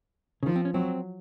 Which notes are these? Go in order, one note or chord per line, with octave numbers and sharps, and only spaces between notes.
C#3
D#3 F3
C4
C#4
F#3 C4